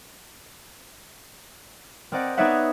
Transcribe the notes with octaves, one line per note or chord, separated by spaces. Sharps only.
C4 A#4 D5 D#5 F#5
B3 D#4 C#5 D5 E5 F#5